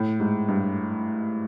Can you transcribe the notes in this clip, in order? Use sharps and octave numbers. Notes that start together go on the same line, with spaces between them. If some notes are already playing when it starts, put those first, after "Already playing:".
Already playing: A2
G#2
G2